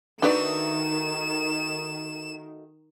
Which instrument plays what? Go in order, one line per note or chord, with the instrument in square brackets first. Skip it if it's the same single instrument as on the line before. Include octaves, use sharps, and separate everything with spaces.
[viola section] D#3 [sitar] A3 D#4 F#4 [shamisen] D4 B4 D5 [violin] E7